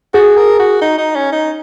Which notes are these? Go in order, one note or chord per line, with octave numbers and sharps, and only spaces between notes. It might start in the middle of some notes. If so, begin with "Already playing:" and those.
F#4 G#4
A#4
F#4
D#4
D#4
C#4
D#4